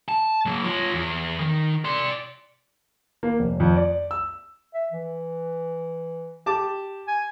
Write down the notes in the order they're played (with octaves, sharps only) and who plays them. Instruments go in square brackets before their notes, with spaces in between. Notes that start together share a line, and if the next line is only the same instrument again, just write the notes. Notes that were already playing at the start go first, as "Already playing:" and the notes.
[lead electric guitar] A5
F#3 A#3
F4 C#5
E2
D#3
D5 C6
[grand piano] A#3
F1
F2
D5
E6
[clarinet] E5
E3
[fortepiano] G4 A5 D6
[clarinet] G#5